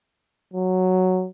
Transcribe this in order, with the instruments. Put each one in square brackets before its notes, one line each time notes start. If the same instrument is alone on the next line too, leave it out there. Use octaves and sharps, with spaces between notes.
[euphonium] F#3